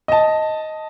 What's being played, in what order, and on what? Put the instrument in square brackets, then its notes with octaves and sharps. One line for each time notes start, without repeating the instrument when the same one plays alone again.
[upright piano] D#5 A5